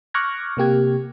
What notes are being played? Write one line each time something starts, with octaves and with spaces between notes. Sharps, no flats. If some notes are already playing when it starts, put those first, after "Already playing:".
C#6 D6 F6 F#6 G#6 A#6
C3 A#3 G4 G#6